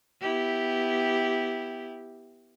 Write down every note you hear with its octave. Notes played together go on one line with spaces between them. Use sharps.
B3 E4 G4